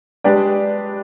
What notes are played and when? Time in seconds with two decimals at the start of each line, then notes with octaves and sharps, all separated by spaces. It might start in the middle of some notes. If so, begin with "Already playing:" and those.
0.24 G#3 D4 G4 B4 D5